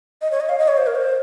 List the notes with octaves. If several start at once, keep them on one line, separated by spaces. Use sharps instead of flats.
D#5
C#5
D#5
F5
D#5
C#5
C5
A#4
C5